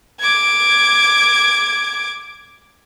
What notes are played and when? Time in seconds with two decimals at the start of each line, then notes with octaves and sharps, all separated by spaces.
0.21 D6 G#6